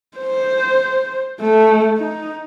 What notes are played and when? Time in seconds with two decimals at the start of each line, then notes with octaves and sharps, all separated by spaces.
0.18 C5
1.40 A3
1.97 D#4